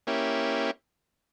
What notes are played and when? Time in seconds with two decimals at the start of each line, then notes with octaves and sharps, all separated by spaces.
0.07 A#3 C#4 E4 G4